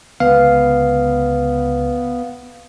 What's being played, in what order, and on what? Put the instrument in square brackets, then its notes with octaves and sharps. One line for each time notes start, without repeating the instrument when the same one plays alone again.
[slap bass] C#2 D3 [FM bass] B3 [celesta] B4 [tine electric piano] F5